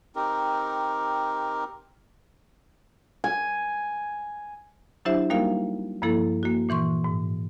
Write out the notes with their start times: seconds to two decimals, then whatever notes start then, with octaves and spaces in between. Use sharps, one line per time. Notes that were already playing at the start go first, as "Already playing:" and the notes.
0.16 C4 D#4 G4 A#4
3.24 G#5
5.05 F#3 D4 E4 G4 C5 E5
5.30 G3 A#3 D#4 F#4 A#4 F5
6.02 G2 F3 A#3 E4 A4
6.43 A#3 F#4
6.69 A#2 E3 C6 C#6
7.04 G#2